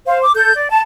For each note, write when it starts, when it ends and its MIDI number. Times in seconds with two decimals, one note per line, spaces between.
0.07 0.22 72
0.07 0.22 77
0.22 0.35 86
0.35 0.54 69
0.35 0.54 91
0.55 0.69 74
0.70 0.82 81